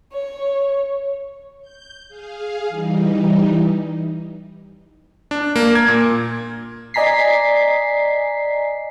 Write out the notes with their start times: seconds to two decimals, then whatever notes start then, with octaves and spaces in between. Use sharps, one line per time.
0.12 C#5
1.61 G6
2.09 G#4 F5
2.69 E3 G3 D#4
5.31 D4
5.56 A#3
5.75 G#6
5.88 A#2
6.94 D5 D#5 G#5 A#5 B6 C7